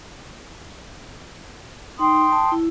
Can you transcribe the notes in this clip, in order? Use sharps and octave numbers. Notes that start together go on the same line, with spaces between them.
D#4 G5 C6 D#6
A5
E4